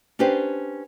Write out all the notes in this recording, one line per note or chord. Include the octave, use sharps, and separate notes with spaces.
C#4 D4 G4 B4 C5